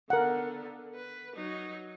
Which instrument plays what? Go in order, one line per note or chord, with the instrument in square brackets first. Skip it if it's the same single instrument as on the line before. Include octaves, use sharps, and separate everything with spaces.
[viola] D3 B3 [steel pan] A#4 F#5
[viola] B4
F#3 D#4